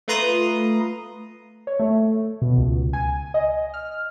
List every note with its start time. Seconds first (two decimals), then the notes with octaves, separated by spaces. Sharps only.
0.08 A3 F4 B4 A#5 C6 D#6
1.67 C#5
1.79 A3
2.42 B2
2.57 C#2
2.93 G#5
3.34 D#5
3.74 F6